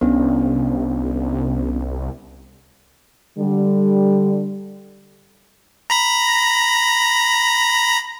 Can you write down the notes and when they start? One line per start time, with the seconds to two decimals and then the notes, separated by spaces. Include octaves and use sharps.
0.01 C2 B3 C#4 D4
3.39 D3 G3
5.90 A#5 B5 A#6